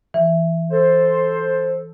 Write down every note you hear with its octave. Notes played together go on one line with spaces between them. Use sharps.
E3
A4 C5